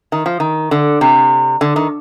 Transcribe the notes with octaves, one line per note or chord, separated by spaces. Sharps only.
D#3
F3
D#3
D3
C3
D3
D#3